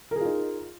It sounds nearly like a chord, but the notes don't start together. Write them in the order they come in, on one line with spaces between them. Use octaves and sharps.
A#4 G#4 F4 D#4